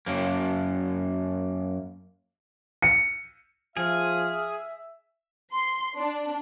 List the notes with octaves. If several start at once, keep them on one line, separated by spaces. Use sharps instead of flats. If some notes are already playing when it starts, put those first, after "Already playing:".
F#2 A#3
C#7
F3 G#4 E5 F6
C6
D4